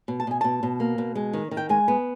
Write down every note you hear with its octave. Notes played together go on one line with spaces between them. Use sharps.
B2
A5
B2 G#5
B2 A5
B2
A#3
B2
G#3
D#3
D#3
G5
G#3 G#5
B3